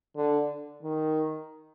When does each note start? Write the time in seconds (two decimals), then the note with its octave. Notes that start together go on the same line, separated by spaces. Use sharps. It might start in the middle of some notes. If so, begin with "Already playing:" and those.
0.17 D3
0.83 D#3